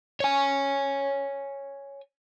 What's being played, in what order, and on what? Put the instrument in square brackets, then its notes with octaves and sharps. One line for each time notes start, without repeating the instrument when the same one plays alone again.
[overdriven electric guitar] C#5 G#5